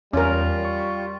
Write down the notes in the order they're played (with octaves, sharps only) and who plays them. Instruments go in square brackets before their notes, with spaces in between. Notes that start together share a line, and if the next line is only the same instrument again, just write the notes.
[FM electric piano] E2 [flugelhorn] G3 [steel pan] C#4 A#4 [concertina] F4
[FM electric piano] C#6